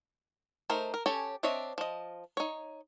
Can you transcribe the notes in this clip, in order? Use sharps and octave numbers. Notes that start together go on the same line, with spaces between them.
A3 D#4 A#4 C5
A#4
C#4 G4 A4 C#5 G#5
C4 D4 C#5 D#5 E5
F3 D#5
D#4 C#5